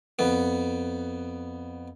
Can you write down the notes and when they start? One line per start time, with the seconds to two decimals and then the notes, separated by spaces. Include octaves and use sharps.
0.19 F2 B3